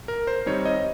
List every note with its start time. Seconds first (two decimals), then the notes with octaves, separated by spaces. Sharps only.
0.08 A#4
0.27 C5
0.46 D#3 G3 C4 D#4 C#5
0.65 D#5